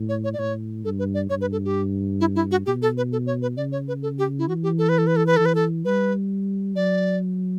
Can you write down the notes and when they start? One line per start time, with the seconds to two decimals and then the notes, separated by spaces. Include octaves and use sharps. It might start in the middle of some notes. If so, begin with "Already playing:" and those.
Already playing: A2
0.09 C#5
0.24 C#5
0.34 D5
0.39 A2 C#5
0.85 G2 A4
0.99 B4
1.14 D5
1.30 G2 C#5
1.41 B4
1.52 A4
1.65 G4
2.20 E4
2.36 E4
2.51 F#4
2.66 B2 G4
2.82 A4
2.97 B4
3.12 A4
3.27 C#5
3.42 B4
3.57 C#3 D5
3.72 C#5
3.88 B4
4.03 A4
4.19 G4
4.39 E4
4.48 E3 F#4
4.63 G4
4.78 A4
4.89 B4
4.98 A4
5.07 B4
5.16 A4
5.27 B4
5.37 E3 A4
5.46 B4
5.55 A4
5.85 G3 B4
6.76 F#3 D5